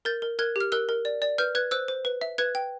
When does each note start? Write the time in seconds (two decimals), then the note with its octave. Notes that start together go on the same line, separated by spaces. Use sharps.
0.05 A#4 G6 A6
0.22 A#4
0.39 A#4 F#6 G#6
0.56 G4 F6
0.72 A#4 E6 F#6
0.89 A#4
1.05 D5
1.22 D5
1.38 B4 F6 G6
1.55 B4 F#6 G#6
1.71 C5 E6 F#6
1.88 C5
2.05 B4
2.21 E5
2.38 B4 F#6 G#6
2.55 G5